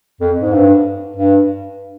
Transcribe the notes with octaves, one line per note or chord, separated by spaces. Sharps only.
F2
G#2
G2
G2